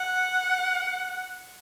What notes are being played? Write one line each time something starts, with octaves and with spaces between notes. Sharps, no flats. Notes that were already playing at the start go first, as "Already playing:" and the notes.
Already playing: F#5